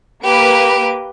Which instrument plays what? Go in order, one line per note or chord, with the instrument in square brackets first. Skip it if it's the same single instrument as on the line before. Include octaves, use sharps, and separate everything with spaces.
[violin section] A#3 B4 D7 [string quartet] G4